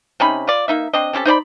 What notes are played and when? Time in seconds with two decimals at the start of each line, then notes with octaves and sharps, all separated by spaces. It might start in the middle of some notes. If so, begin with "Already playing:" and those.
0.20 C3 C#4 D#4 B5
0.47 F4 D5
0.68 A#3 D#4 E5
0.93 C4 D4 D#5
1.13 C4 C#4 G4 A4
1.25 D#4 C5 D5 B5